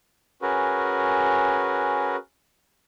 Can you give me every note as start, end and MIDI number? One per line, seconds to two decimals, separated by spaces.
0.42 2.16 61
0.42 2.16 66
0.42 2.16 68
0.42 2.16 70
0.42 2.16 71